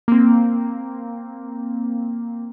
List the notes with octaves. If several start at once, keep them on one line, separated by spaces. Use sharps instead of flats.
A#3 C4